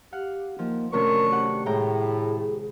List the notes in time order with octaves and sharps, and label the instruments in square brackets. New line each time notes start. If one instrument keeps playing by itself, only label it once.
[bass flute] G4 [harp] F5 F#5
[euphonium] D#3 [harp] F3 [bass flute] A#3
[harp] C3 D#3 A3 [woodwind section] F#3 D4 C#6 [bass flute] C#4 [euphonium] A#4
[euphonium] G4 [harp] F#5
[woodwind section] A2 [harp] G#3 G5 A#5 [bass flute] G#4